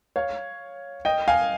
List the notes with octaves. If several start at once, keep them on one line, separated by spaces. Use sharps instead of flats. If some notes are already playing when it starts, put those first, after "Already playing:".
C#5 F5
D#5 G5
F5 G#5